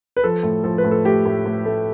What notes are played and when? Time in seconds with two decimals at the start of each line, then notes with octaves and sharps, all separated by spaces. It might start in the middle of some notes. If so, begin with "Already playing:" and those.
0.17 B4
0.24 F3 A4
0.43 A2
0.64 F3 A4
0.78 B4
0.84 A2
0.91 A4
1.05 A3 G4
1.26 A2
1.46 A2
1.65 A3